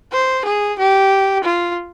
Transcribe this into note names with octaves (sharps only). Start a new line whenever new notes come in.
C5
G#4
G4
F4